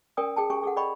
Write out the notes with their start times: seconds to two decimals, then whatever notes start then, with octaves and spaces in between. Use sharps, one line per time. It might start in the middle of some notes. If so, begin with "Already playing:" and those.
0.17 C#4 A#4 D5 G5 G#5 D#6
0.36 G#4 G5 A5
0.50 C#4 G4 G5 G#5 C#6
0.63 G#4 A4 F#5
0.77 D5 D#5 G5 B5 C#6